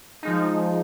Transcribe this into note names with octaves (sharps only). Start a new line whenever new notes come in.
F3 G#3 D#4